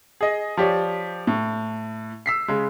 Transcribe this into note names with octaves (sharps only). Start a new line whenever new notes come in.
G#4 D#5
F3 G4 C#5 D5
A2
E6 B6 C7
C#3 G#3